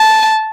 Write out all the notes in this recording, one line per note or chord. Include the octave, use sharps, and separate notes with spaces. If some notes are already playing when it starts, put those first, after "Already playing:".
Already playing: A5